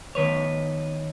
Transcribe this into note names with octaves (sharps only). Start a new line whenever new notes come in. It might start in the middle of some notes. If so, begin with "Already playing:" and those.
D#3 B4 C#5